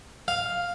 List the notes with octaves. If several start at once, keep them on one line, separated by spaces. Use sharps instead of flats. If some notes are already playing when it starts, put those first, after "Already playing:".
F5